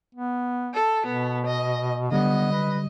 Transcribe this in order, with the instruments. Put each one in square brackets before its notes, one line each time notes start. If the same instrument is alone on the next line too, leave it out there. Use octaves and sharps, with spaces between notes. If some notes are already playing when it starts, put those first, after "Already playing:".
[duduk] B3
[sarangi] A4
[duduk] B2 [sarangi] B3
[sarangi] D#5
[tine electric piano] D3 G3 [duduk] B3 [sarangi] D#5
[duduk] B4